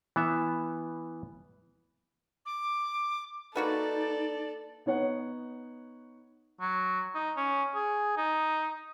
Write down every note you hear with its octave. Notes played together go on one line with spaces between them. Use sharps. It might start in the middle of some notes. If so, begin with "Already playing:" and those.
E3 B3 E5
D6
A#3 D#4 F#4 A4 B4 D5
B3 D#4 C#5 F#5
F#3
D#4
C#4
G#4
D#4